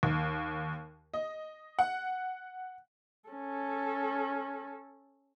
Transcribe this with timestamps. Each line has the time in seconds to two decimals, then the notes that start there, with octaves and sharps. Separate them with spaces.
0.03 D#2
1.14 D#5
1.79 F#5
3.29 C#4 A4